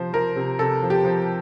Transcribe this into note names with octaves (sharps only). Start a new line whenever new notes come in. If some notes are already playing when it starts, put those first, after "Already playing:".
Already playing: C3 F3 C5
F3 A#4
C3
C3 A4
F3
G4
F3